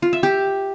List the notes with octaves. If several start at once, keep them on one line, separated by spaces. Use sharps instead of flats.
F4
E5
G4